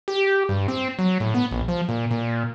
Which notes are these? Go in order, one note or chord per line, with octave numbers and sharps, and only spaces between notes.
G4
G2
C4
F#3
A2
B3
A#1
F3
A#2
A#2